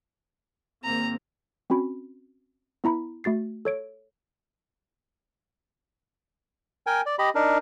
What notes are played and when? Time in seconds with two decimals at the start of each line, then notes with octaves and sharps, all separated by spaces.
0.84 G#1 A#3 C4 A#5
1.70 C4 C#4 F#4 B5
2.84 B3 E4 A#5 B5
3.24 A3 F#4 A6 C7
3.65 A4 C#5 D7
6.87 A#4 G5 G#5
7.06 D5
7.19 G4 D#5 B5
7.35 D4 D#4 A#4